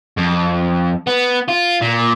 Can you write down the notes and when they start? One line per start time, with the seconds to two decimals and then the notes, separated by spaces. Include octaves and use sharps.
0.18 F2
1.07 B3
1.49 F4
1.82 A#2